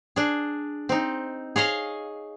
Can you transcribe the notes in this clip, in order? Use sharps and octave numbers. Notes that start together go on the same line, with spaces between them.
D4 G#4
C4 D#4
G#4 C#5 D#5 F5